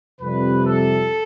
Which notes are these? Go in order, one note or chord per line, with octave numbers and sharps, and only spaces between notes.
F2 C3 G3 B4
A4